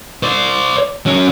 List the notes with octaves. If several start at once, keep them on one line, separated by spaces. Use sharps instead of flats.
C5 D5
F#3 C#4